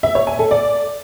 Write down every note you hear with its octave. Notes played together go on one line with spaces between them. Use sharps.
E5
C#5
G#5
A4
D5